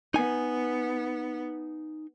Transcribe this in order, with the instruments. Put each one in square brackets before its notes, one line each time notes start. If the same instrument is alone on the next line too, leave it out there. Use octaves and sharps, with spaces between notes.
[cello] B3 [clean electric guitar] D#4 G#5